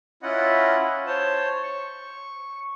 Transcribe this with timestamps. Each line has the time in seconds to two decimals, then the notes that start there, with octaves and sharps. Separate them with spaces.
0.23 C#4 E4 F4 D#5 F#5
1.07 C5 C#5 A5
1.63 C#6